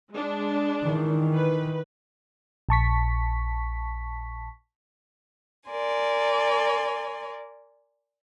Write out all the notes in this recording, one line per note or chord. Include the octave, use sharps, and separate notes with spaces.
G#3 D4
D#3 E3
B4
A#1 A5 C#6 B6
A#4 D5 G#5 C6